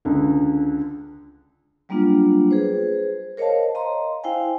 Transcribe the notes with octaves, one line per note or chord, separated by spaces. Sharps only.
C#2 D3
F#3 G3 A#3 B3 D4 F4
G#4 B4 C5
A#4 C5 C#5 D#5 F5 A5
D#5 A#5 C6
E4 C5 F5 G5 G#5